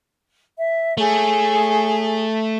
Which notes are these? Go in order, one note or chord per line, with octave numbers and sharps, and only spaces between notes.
E5
A3 G#4 C#5